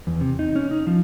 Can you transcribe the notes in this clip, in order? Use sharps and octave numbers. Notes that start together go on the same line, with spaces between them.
E2
C3
D#4
C#4
D#4
F3